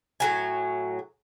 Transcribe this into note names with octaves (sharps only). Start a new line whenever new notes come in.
A2 F#3 G#5